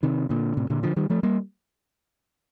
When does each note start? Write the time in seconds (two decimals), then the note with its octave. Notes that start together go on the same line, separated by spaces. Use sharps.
0.03 C3 D#3
0.29 A#2 D3
0.57 A2 C3
0.70 A#2 D3
0.83 D3 F3
0.96 D#3 G3
1.10 F3 A3
1.23 G3 A#3